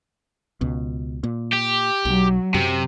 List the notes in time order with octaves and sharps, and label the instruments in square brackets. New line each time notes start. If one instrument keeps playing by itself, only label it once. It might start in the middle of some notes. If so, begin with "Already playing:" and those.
[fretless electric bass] C#2 B2
A#2
[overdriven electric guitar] G4
[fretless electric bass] B1 [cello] F#3
[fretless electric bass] F#2 [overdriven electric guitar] C3